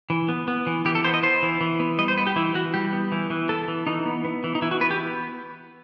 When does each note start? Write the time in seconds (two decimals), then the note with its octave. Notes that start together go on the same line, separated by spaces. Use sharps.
0.10 E3
0.29 B3
0.48 B3
0.67 E3
0.85 E3 G4
0.95 A4
1.04 B3 C5
1.14 D#5
1.23 B3 C5
1.43 E3
1.61 E3
1.80 B3
1.99 G3 D#5
2.08 C5
2.17 B3 B4
2.27 G4
2.36 E3 E4
2.55 E3 F#4
2.74 G3 G4
2.93 B3
3.12 E3
3.30 E3
3.49 B3 A4
3.68 E3
3.87 E3 D#4
4.06 B3
4.25 B3
4.44 E3
4.55 D#4
4.62 E3 E4
4.71 F#4
4.81 B3 B4
4.91 G4